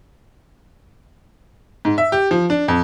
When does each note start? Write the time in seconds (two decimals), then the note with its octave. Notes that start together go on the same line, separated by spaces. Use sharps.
1.85 G#2
1.98 E5
2.12 G4
2.31 F3
2.50 D4
2.68 F2